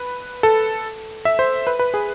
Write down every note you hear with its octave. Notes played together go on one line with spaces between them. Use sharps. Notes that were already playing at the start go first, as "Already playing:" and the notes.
Already playing: B4
A4
E5
C5
B4
B4
G#4